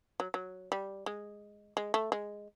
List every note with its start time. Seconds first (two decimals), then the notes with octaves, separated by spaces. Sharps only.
0.20 F#3
0.34 F#3
0.72 G3
1.06 G#3
1.77 G#3
1.94 A3
2.12 G#3